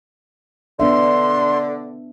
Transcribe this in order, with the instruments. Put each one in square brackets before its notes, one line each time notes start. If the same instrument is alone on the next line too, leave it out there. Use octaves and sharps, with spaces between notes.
[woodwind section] D3 [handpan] B3 D4 E5 [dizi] C6